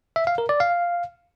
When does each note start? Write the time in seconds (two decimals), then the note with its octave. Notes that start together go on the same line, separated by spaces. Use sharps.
0.16 E5
0.27 F5
0.38 A#4
0.49 D5
0.60 F5